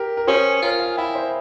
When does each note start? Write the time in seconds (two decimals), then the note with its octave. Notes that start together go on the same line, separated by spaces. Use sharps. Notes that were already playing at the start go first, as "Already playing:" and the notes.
Already playing: G4 A#4
0.17 A#4
0.27 C#4 G#4 C5
0.62 F4 A#4 C#5
0.80 F5 G#5
0.97 E4 E5 G5
1.15 C5 E5